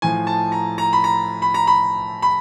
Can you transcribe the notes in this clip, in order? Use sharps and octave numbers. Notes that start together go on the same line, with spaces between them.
A2 F3 G#5
A5
A#5
A#5
B5
A#5
B5
A#5
B5
B5